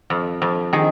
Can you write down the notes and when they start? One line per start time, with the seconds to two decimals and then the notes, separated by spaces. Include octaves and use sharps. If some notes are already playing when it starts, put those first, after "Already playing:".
0.10 F2
0.42 F2
0.73 D#3 G#4